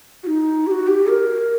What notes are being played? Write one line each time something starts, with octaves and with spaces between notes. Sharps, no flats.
F#4
D#4
G4
F#4
G4
A#4